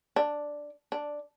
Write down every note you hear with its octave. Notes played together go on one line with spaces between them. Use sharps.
D4
D4